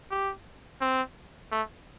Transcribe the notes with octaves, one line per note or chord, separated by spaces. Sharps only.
G4
C4
A3